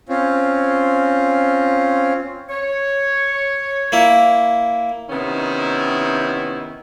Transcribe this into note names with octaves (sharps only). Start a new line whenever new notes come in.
C4 C#4 F4
C#5
A#3 E4
C3 D#3 B3 C#4 D#4 E4